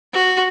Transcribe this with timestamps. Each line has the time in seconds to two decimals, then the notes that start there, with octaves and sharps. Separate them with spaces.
0.13 F#4